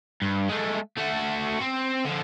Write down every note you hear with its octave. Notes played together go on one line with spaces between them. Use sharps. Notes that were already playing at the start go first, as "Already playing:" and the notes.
G2
G#3 A3
A3 F#4
C4
D3 F3